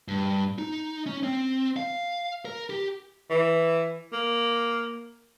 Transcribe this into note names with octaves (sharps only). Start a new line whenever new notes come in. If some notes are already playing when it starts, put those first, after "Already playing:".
G2
D#4
C#4
C4
F5
A#4
G4
E3
A#3